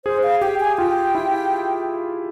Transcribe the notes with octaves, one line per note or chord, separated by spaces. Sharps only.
G#4 C5
F5
G4 G5
G#5
F4 G5
E4